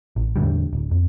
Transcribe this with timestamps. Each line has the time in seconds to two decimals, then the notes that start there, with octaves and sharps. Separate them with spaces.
0.16 A1
0.36 E2 A2 D3 G3
0.73 D1
0.91 F2